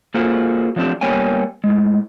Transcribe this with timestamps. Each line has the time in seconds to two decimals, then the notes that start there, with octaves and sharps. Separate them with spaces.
0.14 A#3 F4 F#4 G#4 A4 C5
0.76 F3 F#3 A3 C4 D4 G4
1.01 G3 A#3 B3 C#5 G5 G#5
1.64 A2 G#3